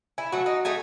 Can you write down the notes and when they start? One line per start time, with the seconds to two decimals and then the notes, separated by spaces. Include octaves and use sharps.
0.18 E4 G#5
0.32 F#3 A3 F#4
0.46 D#4
0.65 A3 D#4 G#5